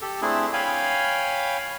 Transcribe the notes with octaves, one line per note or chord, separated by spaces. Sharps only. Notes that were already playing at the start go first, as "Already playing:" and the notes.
G4 A4
A3 C4 D4 E4 G#4
C#5 F5 G5 G#5 B5